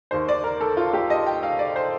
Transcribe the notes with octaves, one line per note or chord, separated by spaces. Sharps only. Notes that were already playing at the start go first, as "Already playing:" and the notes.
D#2 D#3 C5
D5
A#4
A4
F4
G4
D#5
G5
F5
D5
C5